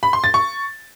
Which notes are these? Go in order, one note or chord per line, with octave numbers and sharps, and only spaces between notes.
B5
C6
A6
C#6